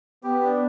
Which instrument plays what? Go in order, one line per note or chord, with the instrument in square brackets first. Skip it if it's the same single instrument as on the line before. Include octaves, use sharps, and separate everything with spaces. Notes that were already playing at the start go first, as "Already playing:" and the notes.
[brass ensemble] B3 [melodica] G4
[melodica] D4